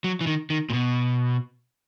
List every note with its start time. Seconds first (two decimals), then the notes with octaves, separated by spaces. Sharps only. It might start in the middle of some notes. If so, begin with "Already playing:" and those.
0.04 F#3
0.21 E3
0.27 D#3
0.50 D#3
0.70 A#2
0.73 B2